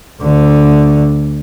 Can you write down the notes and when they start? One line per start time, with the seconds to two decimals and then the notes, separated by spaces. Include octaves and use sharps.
0.22 D2 D3